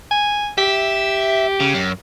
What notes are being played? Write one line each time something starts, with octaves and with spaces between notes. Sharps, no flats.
G#5
G4 E5
C#3
F#2